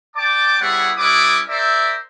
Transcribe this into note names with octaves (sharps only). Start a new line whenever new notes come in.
D5 G5 A5 D6
G3 B3 E4 G#4 C#5 F#5
G3 C#4 E4 B4 D6 D#6
A#4 C5 D5 E5